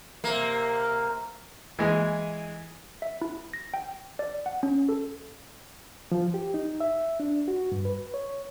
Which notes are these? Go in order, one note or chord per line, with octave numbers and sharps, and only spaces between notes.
C3 A#3
E3 G#3 G#5
E5
E4
A#6
G5
D5
F#5
C#4
A4
F3
G4
D#4
E5
D4
F#4
G2
B4
C#5